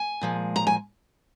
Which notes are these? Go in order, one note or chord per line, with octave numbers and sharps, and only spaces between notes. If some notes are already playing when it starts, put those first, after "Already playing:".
Already playing: G#5
A#2 F3 G#3
A#5
G#5